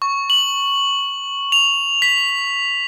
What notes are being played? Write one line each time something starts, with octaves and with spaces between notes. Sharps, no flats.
C#6
F#7
F7
B6